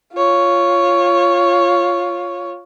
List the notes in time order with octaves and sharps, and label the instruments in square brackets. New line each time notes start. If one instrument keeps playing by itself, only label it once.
[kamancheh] F4 C#5